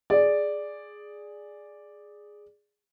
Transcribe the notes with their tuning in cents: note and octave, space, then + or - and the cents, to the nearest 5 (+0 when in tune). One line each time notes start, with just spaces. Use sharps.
G#4 +0 D5 +0